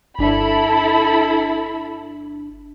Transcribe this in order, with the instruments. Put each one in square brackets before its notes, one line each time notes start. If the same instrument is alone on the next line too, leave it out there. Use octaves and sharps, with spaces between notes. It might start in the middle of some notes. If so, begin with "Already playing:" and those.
[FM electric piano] G1 D4 [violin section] E4 A4 B5